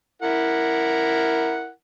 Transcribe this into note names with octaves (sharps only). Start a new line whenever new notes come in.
E4 A#4 F#5